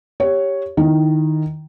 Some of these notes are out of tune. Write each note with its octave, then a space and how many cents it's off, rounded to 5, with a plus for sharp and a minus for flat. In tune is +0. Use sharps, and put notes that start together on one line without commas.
G4 +0 C#5 +0
D#3 -5 E4 -5